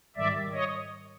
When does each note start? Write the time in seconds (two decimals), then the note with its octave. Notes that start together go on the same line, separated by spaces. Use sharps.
0.16 G#2 D#3 G3 D5 E5
0.53 C#5 D#5